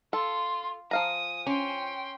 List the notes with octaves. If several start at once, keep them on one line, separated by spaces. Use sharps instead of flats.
F4 A4 C6
F3 F5 G#5 A#5 D#6
C#4 G5 C6